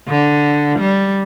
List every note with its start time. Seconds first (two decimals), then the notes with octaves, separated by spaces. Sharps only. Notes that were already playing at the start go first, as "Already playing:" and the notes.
0.08 D3
0.80 G3